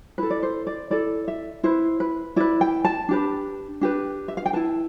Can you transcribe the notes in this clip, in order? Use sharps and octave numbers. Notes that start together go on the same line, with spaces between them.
E4 A4 B4
D5
C5
D5
E4 A4 D5
E5
E4 B4 C5
B4
E4 B4 D5
G5
A5
D4 G4 B4
D4 G4 B4
E5
F5
G5
E4 B4 A5